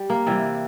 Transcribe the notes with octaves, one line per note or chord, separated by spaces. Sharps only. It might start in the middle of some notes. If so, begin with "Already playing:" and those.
Already playing: G3
A#3
C3 E3 G3